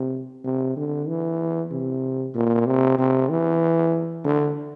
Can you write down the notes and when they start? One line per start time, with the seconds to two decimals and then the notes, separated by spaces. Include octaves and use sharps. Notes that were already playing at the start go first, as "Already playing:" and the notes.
Already playing: C3
0.44 C3
0.77 D3
1.08 E3
1.71 C3
2.35 A#2
2.66 C3
2.99 C3
3.30 E3
4.25 D3